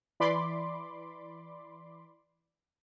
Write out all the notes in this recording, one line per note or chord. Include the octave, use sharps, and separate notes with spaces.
E3 D5 B5 C6 D6